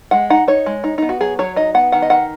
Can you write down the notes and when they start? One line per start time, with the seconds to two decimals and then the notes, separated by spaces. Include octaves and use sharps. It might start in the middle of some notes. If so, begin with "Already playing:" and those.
0.11 G#3 F#5
0.30 D#4 F#5
0.48 D#4 C#5
0.66 G#3
0.84 D#4
0.98 B3 D#4
1.09 F#4
1.21 F#3 G#4
1.39 F#3 C#5
1.56 D#4 D#5
1.75 B3 F#5
1.92 D#3 F#5
2.02 D#5
2.10 D#3 F#5